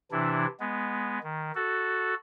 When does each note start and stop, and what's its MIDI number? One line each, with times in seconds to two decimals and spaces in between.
0.12 0.46 48
0.12 0.46 52
0.12 0.46 62
0.12 0.46 64
0.60 1.19 56
0.60 1.19 59
1.24 1.52 51
1.55 2.14 66
1.55 2.14 69